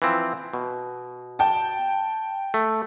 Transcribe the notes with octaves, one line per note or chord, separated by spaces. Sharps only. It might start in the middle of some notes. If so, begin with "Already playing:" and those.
E3 F3 C4
B2
G5 A5
A3